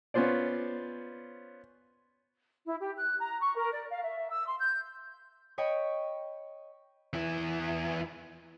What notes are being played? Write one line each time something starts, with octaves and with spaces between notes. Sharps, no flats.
B3 C#4 F4 C5 D5
E4
G4
F#6
A#5
C#6
A#4
D5
F5
E5
E6
C6
G6
C#5 D#5 G5 B5 C#6
E2 E4